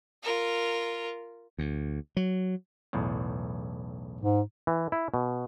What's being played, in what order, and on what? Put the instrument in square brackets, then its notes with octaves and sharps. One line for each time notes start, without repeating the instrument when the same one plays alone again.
[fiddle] F4 A#4
[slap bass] D2
F#3
[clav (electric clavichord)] B1 E2 A2
[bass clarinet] G#2
[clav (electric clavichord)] E3
E4
B2